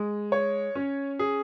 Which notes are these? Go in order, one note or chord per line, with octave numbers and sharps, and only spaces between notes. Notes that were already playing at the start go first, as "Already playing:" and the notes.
Already playing: G#3
C#5
C#4
G#4